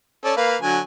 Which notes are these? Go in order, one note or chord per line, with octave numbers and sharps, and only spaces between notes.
C#4 A4 D5
A#3 B4 F5
D3 F#3 G#5